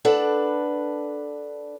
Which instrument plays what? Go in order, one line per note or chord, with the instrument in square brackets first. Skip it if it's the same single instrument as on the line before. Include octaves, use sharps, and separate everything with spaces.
[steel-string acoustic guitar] D4 A4 B4 F#5